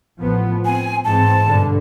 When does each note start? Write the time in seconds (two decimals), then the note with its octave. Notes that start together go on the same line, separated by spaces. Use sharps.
0.20 A1 F3 B3
0.65 C4 G#5
1.05 G#2 E3 C4 A5
1.46 G2 B2 D3